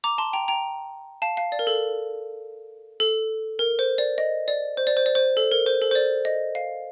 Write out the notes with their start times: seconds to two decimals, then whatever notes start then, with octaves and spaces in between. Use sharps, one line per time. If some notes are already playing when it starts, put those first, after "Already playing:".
0.04 A#5 D6
0.18 A5 C6
0.33 G5 A#5
0.48 G5 A#5
1.22 F5 A5
1.37 F5
1.52 D5
1.59 A#4
1.67 A4
3.00 A4
3.59 A#4
3.79 C5
3.98 D5
4.18 D#5
4.48 D5
4.77 C5
4.87 D5
4.97 C5
5.06 D5
5.15 C5
5.37 A4
5.52 A#4
5.66 C5
5.82 A4
5.91 C5
5.95 D5
6.25 D#5
6.55 F5